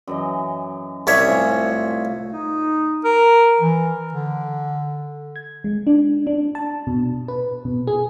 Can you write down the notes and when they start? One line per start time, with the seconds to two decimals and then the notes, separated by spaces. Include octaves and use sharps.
0.07 F#2 E3 D#5
1.07 C2 C#5 E5
1.27 A2 F4 G#5
2.33 D#4
3.04 A#4
3.60 E3
4.13 D3
5.36 G#6
5.64 G#3
5.87 D4
6.27 D4
6.55 A5
6.87 B2
7.28 B4
7.65 B2
7.87 G#4